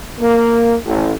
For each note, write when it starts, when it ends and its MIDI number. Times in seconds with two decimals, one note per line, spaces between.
0.20 0.74 58
0.85 1.11 33